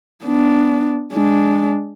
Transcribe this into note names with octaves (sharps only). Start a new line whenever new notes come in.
B3 D4
G#3 D4